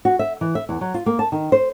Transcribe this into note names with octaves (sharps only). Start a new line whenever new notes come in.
F#4
E5
E3
E5
E2
F#3
F4
A#3
A5
D#3
C5